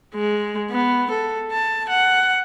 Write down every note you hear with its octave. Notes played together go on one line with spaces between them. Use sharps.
G#3
B3
A4
A5
F#5